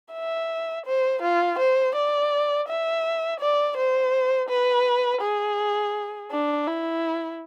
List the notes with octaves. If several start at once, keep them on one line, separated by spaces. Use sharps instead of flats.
E5
C5
F4
C5
D5
E5
D5
C5
B4
G#4
D4
E4